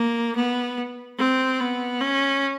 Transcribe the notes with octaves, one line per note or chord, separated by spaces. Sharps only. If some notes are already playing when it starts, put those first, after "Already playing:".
Already playing: A#3
B3
C4
B3
C#4